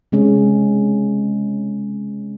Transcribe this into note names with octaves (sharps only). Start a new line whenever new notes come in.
C3 G#3 C#4